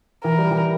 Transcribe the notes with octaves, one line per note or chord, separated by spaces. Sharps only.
E3 A#4
G3
E3